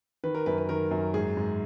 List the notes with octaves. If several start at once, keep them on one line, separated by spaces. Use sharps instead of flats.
D#3 B4
A#4
F#2 B4
B4
D#3 A#4
F#2
G#2 G#4
G#2